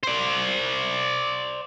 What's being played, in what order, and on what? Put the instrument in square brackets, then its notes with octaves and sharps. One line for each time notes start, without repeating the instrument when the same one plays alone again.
[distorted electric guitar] C5 D5